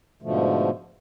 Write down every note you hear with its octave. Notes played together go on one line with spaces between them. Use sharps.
G#2 B2 D3 F3 A3